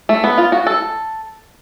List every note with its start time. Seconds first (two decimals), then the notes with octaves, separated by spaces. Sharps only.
0.09 A3
0.24 B3
0.38 F4
0.52 F#4
0.67 A4